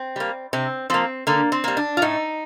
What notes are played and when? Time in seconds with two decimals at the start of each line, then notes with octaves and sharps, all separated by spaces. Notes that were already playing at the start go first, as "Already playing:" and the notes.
Already playing: C4
0.16 G3 A#3
0.53 C3 C4
0.90 F3 A#3 C4
1.27 D3 A#3
1.52 C4
1.64 G3 A#3
1.77 D4
1.97 F4
2.02 A2 D#4